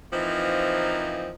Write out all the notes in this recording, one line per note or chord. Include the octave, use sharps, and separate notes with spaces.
E3 F3 A#3 C4 D#4